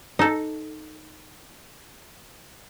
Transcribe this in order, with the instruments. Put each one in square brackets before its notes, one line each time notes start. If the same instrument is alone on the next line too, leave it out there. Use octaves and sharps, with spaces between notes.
[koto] D#4 A4